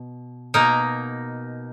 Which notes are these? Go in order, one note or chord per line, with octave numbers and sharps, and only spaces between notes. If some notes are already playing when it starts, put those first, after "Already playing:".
Already playing: B2
B2 A#3 D#4 A#4